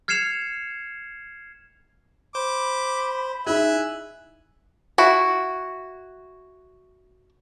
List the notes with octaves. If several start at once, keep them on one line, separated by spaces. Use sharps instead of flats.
F6 G#6 C7 C#7 E7 F7
C5 B5 D6
D#4 E4 G#4 E5 G#5 F#6
E4 F#4